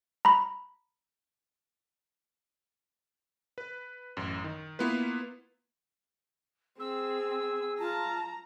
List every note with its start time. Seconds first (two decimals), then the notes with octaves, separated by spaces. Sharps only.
0.25 A#5 B5
3.58 B4
4.17 A1 F#2
4.44 D#3
4.79 A#3 B3 E4 F4 B4
6.79 C4 G#4 E6
7.79 F4 A5 A#5